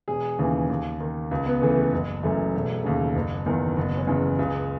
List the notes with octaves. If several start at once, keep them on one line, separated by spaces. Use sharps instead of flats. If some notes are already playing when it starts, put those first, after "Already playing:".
E1 G#4
D#2 C#3 E3
D#2
D#3
C#2
B3
C#3 E3 A3
A3
F#1
F#2 E3 A3
E1
D#2 C#3
F#1
E2 D#3
F#1 B3
C#4
E2 C#3
C#2 G#4